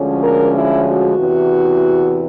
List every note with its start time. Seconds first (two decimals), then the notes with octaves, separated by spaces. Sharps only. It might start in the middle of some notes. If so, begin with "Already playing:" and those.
Already playing: D2 D3 F3 G#3 C#4
0.23 A#4
0.54 E4
0.85 F#4
1.16 E2 C3 E3